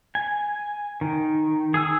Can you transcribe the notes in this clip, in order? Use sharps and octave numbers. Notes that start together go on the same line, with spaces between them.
G#5
D#3
G#4 G#5 E6